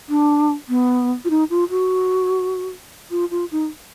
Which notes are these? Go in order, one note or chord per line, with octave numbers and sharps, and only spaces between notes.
D4
B3
F4
D#4
F4
F#4
F4
F4
D#4